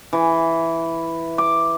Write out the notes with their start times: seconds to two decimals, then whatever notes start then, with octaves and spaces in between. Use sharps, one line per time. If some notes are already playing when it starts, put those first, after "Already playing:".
0.13 E3
1.38 D6